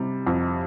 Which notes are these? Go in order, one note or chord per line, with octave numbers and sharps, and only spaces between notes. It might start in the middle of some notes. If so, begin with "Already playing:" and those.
Already playing: C3 G3
F2